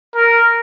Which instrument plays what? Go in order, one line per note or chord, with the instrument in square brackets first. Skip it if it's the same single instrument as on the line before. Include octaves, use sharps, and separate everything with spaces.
[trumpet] A#4